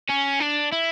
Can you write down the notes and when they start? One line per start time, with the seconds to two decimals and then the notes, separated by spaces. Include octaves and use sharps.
0.10 C#4
0.40 D4
0.72 E4